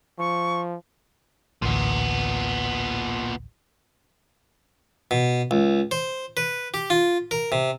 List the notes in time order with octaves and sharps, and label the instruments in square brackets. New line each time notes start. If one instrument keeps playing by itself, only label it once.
[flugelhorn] F3 [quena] C#6
[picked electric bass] A1 D2 [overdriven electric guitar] A#2 B3
[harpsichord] B2
C#2
C5
B4
G4
F4
A#4
C3